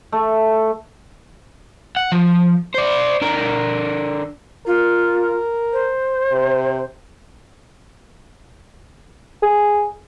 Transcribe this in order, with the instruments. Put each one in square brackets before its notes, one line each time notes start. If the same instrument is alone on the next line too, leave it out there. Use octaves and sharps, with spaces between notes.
[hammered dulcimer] A3
[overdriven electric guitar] F#5
F3
C5 D5
D3 A#4
[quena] F4 [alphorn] A#4
[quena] C5
[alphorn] C3
[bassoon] G#4